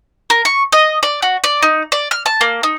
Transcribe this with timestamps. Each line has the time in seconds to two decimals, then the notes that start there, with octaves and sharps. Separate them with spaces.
0.30 A#4
0.45 C#6
0.72 D#5
1.03 D5
1.22 F#4
1.44 D5
1.63 D#4
1.92 D5
2.11 F6
2.26 A5
2.41 A#3
2.63 D#4